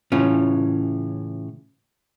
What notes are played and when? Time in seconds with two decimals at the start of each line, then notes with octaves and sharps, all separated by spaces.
0.12 A2 C#3 E3 C#4 F4